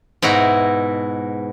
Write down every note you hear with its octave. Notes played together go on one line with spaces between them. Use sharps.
G#2 B2 E4 F#4 A#5